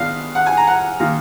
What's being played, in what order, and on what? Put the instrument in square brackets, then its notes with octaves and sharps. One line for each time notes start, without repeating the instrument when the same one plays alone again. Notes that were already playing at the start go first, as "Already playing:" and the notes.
Already playing: [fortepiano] D#3 G#3 B3 D4 F4 F5
F#5
G#5
A#5
F#5
D#3 A#3 F4